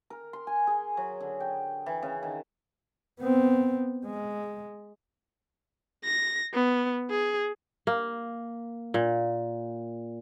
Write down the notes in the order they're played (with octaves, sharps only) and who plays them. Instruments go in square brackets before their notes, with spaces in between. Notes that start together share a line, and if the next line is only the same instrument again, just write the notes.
[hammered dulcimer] A#4
C6
G#5
G#4
F#3
D3
G5
E3
C#3
D#3
[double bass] B3 C4
G#3
[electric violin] A#6
B3
G#4
[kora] A#3
A#2